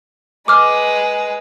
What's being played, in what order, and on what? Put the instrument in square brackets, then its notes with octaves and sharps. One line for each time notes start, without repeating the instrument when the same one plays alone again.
[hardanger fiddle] G#3 B4 [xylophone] D6 F6